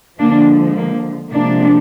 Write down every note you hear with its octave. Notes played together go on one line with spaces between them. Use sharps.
D3 F3 G#3 A#3 D4
A#3
C3 F3 G#3 A#3 D4